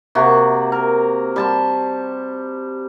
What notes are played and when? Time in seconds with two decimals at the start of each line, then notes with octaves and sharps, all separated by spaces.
0.15 C3 A#3 F#4
0.72 A#4
1.36 G3 A5 C6